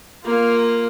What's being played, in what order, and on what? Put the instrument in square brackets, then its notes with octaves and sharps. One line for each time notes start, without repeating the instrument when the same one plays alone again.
[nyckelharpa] A#3 F4